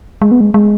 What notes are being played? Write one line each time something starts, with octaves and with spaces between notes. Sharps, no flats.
G#3
B3
G#3
G#3